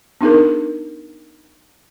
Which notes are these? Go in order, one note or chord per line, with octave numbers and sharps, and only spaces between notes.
B3 D4 D#4 G#4 A#4